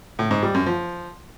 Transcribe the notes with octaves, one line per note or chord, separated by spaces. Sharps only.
A2
G#2
G3
F#2
F3